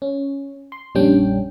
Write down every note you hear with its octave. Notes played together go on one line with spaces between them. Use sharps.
C#4
C6
A#1 F2 G3 C#4 D4 G5